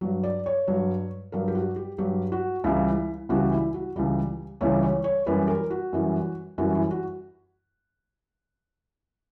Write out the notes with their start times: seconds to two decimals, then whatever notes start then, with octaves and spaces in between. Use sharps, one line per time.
0.01 G2 F#3
0.23 D5
0.46 C#5
0.67 G2 F#3
1.32 G2 F#3 A#4
1.48 G4
1.55 F#4
1.76 G4
1.98 G2 F#3 G4
2.32 F#4
2.64 C#2 C#3 E3 G3 E4
3.29 C#2 C#3 E3 G3 F#4
3.52 E4
3.74 F#4
3.96 C#2 C#3 E3 G3 G4
4.61 C#2 C#3 E3 G3 C#5
4.83 C#5
5.04 C#5
5.26 F#2 E3 G3 B4
5.48 A#4
5.70 F#4
5.93 F#2 E3 G3
6.58 F#2 E3 G3 F#4
6.75 E4
6.91 F#4